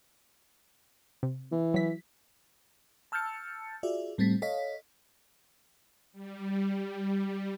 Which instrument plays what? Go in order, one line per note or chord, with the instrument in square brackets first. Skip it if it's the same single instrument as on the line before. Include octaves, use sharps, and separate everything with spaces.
[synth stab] C3
[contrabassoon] E3
[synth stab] F#3 B6
[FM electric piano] A5 E6 F6 G6 A6 C#7
F4 F#4 G#4 D5 E5
A2 G3 A3 C4 A6 B6
A4 C#5 D#5 F5 B6
[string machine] G3